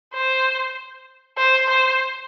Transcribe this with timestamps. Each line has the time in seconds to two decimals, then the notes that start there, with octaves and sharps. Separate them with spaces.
0.14 C5
1.37 C5
1.68 C5